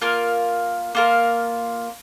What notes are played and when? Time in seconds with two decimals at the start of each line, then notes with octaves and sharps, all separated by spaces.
0.01 A#3 F4 A#4
0.95 A#3 F4 A#4